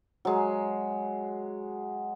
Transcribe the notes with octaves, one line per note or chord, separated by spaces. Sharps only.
F#3 G#3